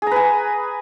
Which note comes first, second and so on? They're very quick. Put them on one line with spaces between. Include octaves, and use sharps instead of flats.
G#4 A#5 B4 G#5